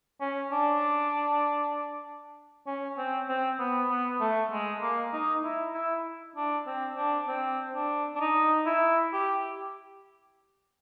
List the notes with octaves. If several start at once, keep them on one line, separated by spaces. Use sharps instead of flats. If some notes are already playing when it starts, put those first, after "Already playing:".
C#4
D4
C#4
C4
C4
B3
B3
A3
G#3
A#3
D#4
E4
E4
D4
C4
D4
C4
D4
D4
D#4
E4
G4